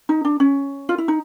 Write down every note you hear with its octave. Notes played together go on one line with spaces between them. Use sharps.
D#4
D4
C#4
F4
E4
D#4